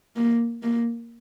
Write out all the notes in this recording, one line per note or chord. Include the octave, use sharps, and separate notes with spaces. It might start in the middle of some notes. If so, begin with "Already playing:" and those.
A#3
A#3